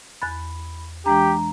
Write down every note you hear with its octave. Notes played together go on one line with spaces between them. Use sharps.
E2 B5 F#6 A6
E3 G#3 D4 G4 A#5